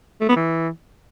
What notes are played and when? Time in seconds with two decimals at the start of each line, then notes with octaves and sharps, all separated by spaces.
0.21 A3
0.29 B3
0.36 E3